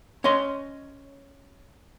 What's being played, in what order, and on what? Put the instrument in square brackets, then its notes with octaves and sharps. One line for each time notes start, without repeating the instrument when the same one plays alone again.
[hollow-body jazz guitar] C#4 C#5 D#5 C6